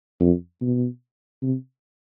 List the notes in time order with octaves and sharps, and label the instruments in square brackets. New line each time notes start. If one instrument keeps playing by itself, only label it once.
[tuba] F2
B2
C3